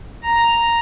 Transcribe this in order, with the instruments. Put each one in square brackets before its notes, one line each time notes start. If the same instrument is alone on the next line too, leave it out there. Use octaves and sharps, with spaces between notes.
[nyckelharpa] A#5